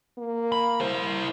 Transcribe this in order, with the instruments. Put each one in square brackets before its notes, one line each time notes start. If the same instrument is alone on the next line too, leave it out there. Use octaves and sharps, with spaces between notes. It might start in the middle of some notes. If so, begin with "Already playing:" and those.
[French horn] A#3
[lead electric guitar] B5
E4 C5